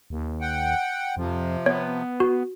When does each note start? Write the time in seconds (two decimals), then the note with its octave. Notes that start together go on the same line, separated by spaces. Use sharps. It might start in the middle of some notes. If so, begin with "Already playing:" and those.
0.10 D#2
0.41 F#5 G5
1.17 F2 C3 F3
1.66 B3 C#5
2.20 F#4